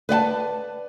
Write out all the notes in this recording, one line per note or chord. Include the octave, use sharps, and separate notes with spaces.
B4 D5 F#5 A5